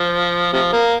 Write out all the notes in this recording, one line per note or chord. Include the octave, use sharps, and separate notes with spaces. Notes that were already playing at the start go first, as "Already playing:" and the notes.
Already playing: F3
C3 F3
A#3